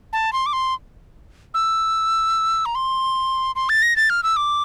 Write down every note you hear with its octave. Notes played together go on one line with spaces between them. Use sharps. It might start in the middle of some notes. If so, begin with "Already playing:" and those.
A5
C6
D6
C6
E6
A#5
C6
C6
A6
A#6
A6
F6
E6
D6